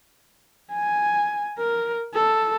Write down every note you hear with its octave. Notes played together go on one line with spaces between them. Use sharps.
G#5
A#4
A4